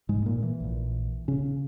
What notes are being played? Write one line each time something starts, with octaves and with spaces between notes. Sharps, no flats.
G#2 G#3
A#2 A#3
E3
A#1 A#2
C#3 C#4